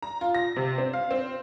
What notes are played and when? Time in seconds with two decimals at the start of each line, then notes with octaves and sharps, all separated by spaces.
0.02 A#5
0.21 F4
0.35 A#6
0.56 C3
0.78 C4
0.93 F5
1.11 C4